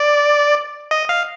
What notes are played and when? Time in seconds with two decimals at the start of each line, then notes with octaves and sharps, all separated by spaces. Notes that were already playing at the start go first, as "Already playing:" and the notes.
Already playing: D5
0.91 D#5
1.09 F5